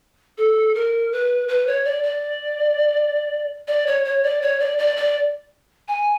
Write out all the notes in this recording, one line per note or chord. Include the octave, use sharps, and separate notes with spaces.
A4
A#4
B4
B4
C#5
D5
D5
D5
C#5
C#5
D5
C#5
D5
D5
D5
G#5